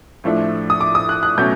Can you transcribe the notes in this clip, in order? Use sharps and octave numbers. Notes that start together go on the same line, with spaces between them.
A2 F3 A3 D4
D#6
D6
D#6
F#6
F#6
B2 F#3 A3 C#4 G6